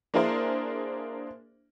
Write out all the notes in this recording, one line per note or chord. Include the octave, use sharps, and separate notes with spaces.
A#3 D4 E4 G#4 A#4 C5